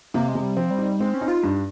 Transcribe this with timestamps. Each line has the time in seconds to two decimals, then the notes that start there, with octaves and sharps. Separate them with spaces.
0.14 C3 A#3
0.29 G#3
0.35 C3
0.43 G3
0.57 F3 C4
0.71 G3
0.78 D#4
0.99 G#3 C4
1.14 C#4
1.21 D#4
1.28 F4
1.43 G2